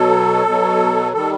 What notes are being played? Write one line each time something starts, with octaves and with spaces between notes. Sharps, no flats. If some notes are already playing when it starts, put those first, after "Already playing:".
Already playing: B2 F#3 A4
B2 F#3
D#3 G3 A4